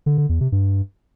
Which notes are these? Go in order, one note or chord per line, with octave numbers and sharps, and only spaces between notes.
D3
D3
E2
C3
G2